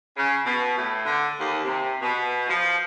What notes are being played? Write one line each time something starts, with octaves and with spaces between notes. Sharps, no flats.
C#3
B2
A2
D3
D#2
C3
B2
F3